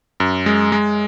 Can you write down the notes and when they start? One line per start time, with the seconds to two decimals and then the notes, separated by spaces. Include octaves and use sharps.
0.20 F#2
0.46 G#3
0.72 G#3